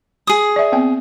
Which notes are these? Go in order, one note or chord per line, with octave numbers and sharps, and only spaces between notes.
G#4 D#6
D5 E5
B3 C4 G5